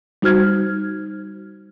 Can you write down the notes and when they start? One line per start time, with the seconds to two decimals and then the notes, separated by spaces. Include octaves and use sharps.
0.22 G3 D#4 F#4 C5 F6 G#6